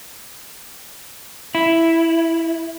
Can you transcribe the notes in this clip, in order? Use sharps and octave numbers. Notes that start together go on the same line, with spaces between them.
E4